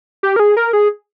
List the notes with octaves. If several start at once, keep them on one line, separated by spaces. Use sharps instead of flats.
G4
A#4
G#4
A#4
G#4